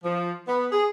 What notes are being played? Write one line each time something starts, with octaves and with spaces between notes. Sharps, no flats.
F3
B3
G#4